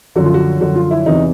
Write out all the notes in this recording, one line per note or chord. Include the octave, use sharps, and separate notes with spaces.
F#2 D3 F3 F#4
F4
F#4
F#2 D3 F3 F#4
F4
E4
E2 C3 E3 D#4